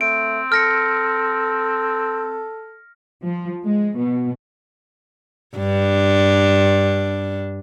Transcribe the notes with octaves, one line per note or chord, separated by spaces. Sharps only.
A3 C4 D7
A4 F6 A#6 C#7
F3
G#3
B2
G2 D4